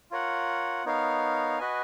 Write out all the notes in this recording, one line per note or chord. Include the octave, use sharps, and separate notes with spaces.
F4 A#4 C#5 F#5
B3 D#4 A#4 C#5 F5
F#4 B4 D#5 G#5